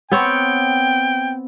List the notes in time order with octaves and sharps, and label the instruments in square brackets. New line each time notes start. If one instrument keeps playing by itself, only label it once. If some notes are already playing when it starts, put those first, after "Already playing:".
[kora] B3 C4 C#5 [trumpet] G5